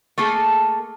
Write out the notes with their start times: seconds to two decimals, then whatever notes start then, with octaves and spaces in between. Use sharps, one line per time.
0.18 A3 A#3 G#4 A4